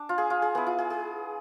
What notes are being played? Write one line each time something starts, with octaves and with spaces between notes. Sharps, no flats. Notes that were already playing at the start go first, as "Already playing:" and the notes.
Already playing: D4
F4
G#4
F4
G#4
B3 E4 G#4
F4
G#4
G#4